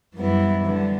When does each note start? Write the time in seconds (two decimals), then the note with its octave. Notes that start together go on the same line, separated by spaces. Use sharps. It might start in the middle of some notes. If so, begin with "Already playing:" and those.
0.15 F#2 E3 G3 B3 E4
0.64 D3 G3 B3